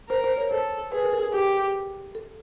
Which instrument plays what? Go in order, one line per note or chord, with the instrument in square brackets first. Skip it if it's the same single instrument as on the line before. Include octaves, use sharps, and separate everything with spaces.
[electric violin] A#4 [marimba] C5
[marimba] C5
C#5
[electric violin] A4 [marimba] C5
[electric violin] G#4 [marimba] B4
[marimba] A#4
A4
G#4
[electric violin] G4
[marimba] A4